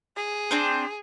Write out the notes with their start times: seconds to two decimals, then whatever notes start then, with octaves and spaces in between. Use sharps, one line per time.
0.16 G#4
0.51 C4 D4 C5